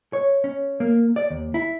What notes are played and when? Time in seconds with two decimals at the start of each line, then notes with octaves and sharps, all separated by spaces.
0.13 C#5
0.44 C#4
0.80 A#3
1.16 D5
1.30 D#2
1.54 E4